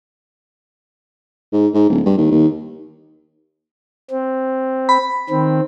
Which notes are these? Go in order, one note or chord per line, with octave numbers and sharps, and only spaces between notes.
G#2
G#2
D1
G2
D#2
D#2
C4
B5
D#3 C4